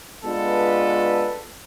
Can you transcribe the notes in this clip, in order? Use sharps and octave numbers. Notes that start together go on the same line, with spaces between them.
G#3 B3 D4 F4 A4 B4